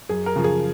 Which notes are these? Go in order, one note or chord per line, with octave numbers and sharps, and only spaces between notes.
F#2 G#4
A#4
C#3 F3
G#4